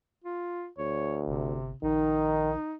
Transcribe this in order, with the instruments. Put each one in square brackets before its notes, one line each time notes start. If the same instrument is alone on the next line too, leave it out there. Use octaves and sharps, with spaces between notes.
[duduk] F4
[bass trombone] D2 [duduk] C#5
[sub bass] G1 [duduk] C3
[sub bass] A#1 [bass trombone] D#3 [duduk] D#4